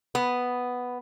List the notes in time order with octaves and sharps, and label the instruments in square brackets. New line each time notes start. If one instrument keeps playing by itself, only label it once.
[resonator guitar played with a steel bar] B3